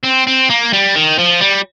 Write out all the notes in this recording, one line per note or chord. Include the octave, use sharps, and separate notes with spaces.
C4
C4
A#3
G3
D#3
F3
G3